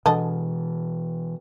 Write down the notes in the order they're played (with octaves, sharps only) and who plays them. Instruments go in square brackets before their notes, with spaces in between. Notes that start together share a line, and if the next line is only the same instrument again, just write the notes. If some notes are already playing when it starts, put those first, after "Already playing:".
[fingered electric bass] B2 E3 [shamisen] D3 D#5 A5